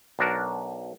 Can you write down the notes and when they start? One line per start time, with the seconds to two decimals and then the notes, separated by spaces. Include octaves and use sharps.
0.19 B1 D4 F#4 A#4